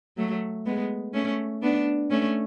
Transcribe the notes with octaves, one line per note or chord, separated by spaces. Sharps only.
F#3 A3
G#3 B3
A3 C#4
B3 D4
A3 C#4